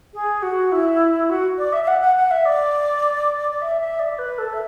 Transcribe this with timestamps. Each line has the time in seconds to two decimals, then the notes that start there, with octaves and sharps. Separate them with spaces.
0.13 G#4
0.42 F#4
0.72 E4
1.29 F#4
1.58 D5
1.72 E5
1.83 E5
1.87 F#5
2.01 F#5
2.16 F#5
2.30 E5
2.45 D5
3.51 D5
3.61 E5
3.80 E5
3.99 D5
4.18 B4
4.38 A4
4.53 E5